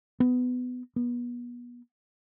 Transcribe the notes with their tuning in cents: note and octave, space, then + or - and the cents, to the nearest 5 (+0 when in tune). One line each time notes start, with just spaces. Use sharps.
B3 +15
B3 -30